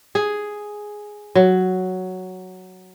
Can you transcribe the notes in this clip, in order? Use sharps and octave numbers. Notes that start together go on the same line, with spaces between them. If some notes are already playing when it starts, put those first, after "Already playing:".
G#4
F#3